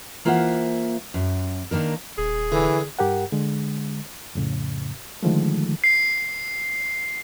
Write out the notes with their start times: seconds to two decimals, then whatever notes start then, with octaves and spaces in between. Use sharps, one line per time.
0.25 E3 A#3 F4 C5 E5 F#5
1.14 F#2
1.71 D#3 A#3 D4 A#4
2.18 D#1 G#4
2.52 D3 E3
2.99 G2 G4 A#4 F#5
3.32 D3 G#3
4.35 F2 A2 C#3
5.23 D3 D#3 F3 G#3 A3
5.84 C7